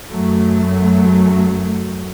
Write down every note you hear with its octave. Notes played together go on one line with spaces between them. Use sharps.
F#2 F#3 A3